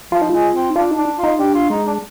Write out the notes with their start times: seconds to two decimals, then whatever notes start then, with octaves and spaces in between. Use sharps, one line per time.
0.12 F3 F4
0.21 D#4
0.29 G#3 F4
0.55 C4
0.70 D#4
0.76 D4 F4
0.91 D#4
0.97 D4
1.18 F4
1.23 D#4
1.39 D4 G4
1.54 F4
1.70 G#3 D#4
1.87 D4